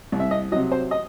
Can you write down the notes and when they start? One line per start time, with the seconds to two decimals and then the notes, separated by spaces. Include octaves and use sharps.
0.12 C2
0.20 E5
0.31 D#5
0.52 F#3 D#5
0.56 C3
0.72 C5
0.91 D#5